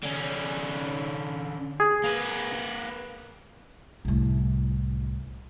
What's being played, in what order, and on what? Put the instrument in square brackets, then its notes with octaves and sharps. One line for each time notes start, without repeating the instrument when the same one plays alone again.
[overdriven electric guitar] D3 C#4
[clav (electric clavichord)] G#4
[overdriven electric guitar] A#3 B4
[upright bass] C2 A2